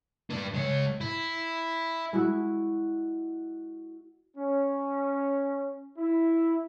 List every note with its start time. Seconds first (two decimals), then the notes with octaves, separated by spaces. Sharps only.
0.30 D4 B4
0.54 G#3 C#5
1.01 E4
2.13 G#3 E4 F#4
4.37 C#4
5.97 E4